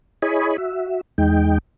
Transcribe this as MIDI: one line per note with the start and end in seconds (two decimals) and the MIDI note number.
0.22 0.57 64
0.22 0.57 68
0.22 0.57 73
0.22 0.57 75
0.22 0.57 80
0.22 0.57 83
0.58 1.01 66
0.58 1.01 76
1.18 1.58 40
1.18 1.58 56
1.18 1.58 63
1.18 1.58 79